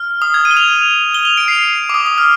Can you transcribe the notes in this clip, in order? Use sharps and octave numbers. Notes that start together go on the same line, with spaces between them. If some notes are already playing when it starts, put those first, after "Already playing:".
Already playing: F6
D#6
G#6
D#7
G7
F7
G7
F7
D7
C7
D6
D#6
D#6
F6